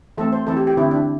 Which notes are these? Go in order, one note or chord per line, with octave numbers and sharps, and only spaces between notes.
E3 A3 C4 A4
C5
E3 C4 A4
G4
G4
D3 C4 E4
D4